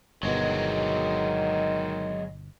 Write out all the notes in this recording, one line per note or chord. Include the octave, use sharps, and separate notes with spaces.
G1 B2 D#3 F#3 G#3